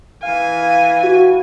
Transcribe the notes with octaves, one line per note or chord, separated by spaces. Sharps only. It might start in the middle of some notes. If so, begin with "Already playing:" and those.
E3 F5 G#5
F#4